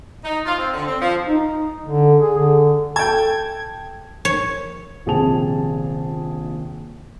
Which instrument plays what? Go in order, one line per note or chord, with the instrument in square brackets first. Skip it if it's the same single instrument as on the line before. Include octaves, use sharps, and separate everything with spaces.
[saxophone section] D#4
F4
C4
D3
C4
F3
[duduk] D#4
D3
G#4
D3
[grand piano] A4 G6 [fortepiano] G5 A5 [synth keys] G#6
[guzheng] C#5
[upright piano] D#1 A#1 C3 G#4 A5 F7